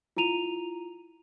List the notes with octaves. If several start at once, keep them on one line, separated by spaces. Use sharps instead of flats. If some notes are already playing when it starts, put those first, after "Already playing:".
E4 F4 A#5 D#7 F7